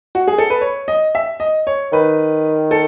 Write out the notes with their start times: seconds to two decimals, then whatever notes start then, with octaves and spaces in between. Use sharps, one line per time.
0.15 F#4
0.28 G#4
0.38 A4
0.50 B4
0.61 C#5
0.88 D#5
1.15 E5
1.40 D#5
1.67 C#5
1.92 D#3 B4
2.71 A4